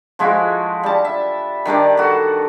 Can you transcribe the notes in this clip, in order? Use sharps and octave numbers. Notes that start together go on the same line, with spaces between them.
F3 G#3 E4 F#4
G3 A5
E5
D#3 G3 D4 D5
F#4 A4